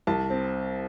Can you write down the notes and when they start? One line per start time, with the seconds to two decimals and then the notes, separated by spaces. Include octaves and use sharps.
0.07 C2 A5
0.30 C4